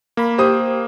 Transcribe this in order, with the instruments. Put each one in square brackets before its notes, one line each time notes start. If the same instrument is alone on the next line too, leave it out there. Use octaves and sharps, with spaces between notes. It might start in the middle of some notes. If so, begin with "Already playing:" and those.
[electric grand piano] A#3 [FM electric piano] F5 B5
[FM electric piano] G4 [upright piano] C5 D#6